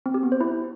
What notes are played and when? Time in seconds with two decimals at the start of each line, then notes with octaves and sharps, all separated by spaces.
0.06 C4
0.14 G4
0.23 B3
0.32 C5
0.41 E4